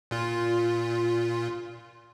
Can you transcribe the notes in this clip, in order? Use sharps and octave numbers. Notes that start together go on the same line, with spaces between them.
A#2 F4